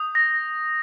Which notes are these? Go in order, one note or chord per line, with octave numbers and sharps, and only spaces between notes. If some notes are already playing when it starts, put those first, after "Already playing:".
Already playing: D#6 G6
A#6